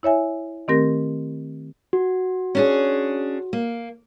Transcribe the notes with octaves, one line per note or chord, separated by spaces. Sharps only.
E4 C#5 E5 G#5
D#3 A3 C4 G4 A#4 A#6
F#4
C#4 D4 G#4
A#3